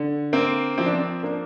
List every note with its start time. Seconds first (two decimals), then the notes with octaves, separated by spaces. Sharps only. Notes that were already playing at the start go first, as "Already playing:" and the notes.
Already playing: D3
0.33 A#3 C4
0.78 F3 C4
0.86 D4
0.94 C4
1.23 A#3 D4